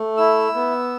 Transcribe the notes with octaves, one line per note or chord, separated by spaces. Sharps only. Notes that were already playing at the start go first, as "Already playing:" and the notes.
Already playing: A3
E4 E6
B3